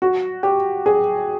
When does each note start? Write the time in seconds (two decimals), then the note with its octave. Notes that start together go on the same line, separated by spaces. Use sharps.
0.02 F#4
0.43 G4
0.86 G#4